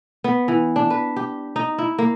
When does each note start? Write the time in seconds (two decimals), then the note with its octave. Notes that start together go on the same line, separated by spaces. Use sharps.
0.24 B3
0.48 E3
0.76 D4
0.90 B4
1.17 G4
1.56 D#4
1.78 E4
1.98 A#3